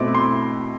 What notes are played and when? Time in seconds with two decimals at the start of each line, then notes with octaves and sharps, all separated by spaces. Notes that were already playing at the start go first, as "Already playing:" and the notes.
Already playing: B2 A3 C4 E4 D6
0.15 C6